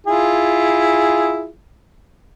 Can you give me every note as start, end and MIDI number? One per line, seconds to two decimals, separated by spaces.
0.06 1.48 64
0.06 1.48 65
0.06 1.48 68